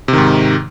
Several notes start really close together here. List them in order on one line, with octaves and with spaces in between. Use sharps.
C3 D#3 G#2